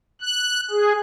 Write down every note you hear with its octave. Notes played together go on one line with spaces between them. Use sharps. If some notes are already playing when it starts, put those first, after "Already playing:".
F#6
G#4